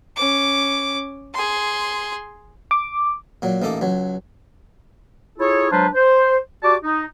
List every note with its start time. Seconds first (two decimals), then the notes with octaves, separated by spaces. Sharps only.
0.16 C#4 D6
1.34 G#4 C6
2.71 D6
3.42 A#2 F#3
3.62 A1 A#3 D#4 A4 D6
3.81 C#2 F#3
5.39 E4 F4 G#4 A4 C#5
5.71 F#3 G#3 D4 F4 B4 C5
5.94 C5
6.63 F#4 G4 D5 A5 D6
6.83 D#4